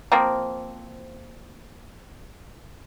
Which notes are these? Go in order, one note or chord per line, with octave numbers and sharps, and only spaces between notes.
F3 A#3 C4